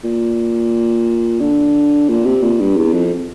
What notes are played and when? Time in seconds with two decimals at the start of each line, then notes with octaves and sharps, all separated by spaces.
0.04 A#2
1.41 D3
2.09 A#2
2.26 C3
2.43 A#2
2.60 G2
2.77 E2
2.94 F2